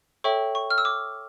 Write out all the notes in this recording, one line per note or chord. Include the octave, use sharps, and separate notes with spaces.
A4 C#5 E5 G5 C#6
C#6
F6
E6
D6